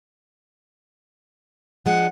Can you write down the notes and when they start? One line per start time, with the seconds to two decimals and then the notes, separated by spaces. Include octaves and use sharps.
1.86 F3 G#3 D4 F#5